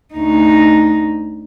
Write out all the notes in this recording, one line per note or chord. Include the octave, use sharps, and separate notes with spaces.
D2 D#4